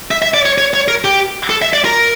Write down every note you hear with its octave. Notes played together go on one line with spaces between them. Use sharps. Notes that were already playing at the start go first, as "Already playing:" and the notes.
E5
E5
D5
C#5
C#5
C#5
A#4
G4
A4
E5
D5
A#4